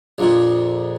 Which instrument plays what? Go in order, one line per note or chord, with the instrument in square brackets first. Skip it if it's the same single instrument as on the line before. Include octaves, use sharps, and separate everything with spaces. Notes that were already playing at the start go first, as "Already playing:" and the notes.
[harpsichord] A#1 F2 A#2